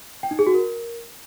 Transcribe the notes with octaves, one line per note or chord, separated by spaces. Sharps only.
G5
D#4
G#4
F#4
A#4